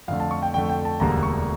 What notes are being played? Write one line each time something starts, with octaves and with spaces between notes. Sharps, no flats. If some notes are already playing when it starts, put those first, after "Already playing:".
F2 D3 A3 F5
A5
C#6
G5
F2 D3 A3 G5
G5
A5
E1 D2 D3 G3 A#3 A#5
C#6